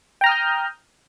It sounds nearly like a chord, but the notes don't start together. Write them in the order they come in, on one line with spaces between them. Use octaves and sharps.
G5 A#5 F6 D#6 G6